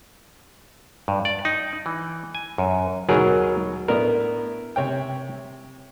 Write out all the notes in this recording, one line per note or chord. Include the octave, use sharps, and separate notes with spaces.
G2
D5
D#4
E3
G#5
F#2
D#2 B2 D#3 F#3 G#4 A#4
A2 B3 D4 A#4
C3 C#5 G5